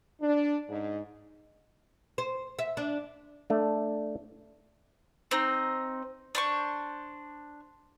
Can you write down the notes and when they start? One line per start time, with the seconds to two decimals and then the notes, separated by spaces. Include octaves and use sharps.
0.21 D4
0.69 G#2
2.18 C5
2.59 E5
2.77 D4
3.50 A3 D4
5.31 C4 D#4
6.35 D4 C5 C#6